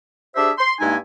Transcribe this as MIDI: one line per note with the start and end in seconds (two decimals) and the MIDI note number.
0.36 0.50 62
0.36 0.50 67
0.36 0.50 68
0.36 0.50 72
0.36 0.50 76
0.58 0.73 84
0.80 0.96 43
0.80 0.96 56
0.80 0.96 58
0.80 0.96 63
0.80 0.96 64
0.80 0.96 80